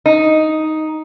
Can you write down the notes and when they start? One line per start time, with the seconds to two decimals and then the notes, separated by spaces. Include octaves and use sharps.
0.06 D#4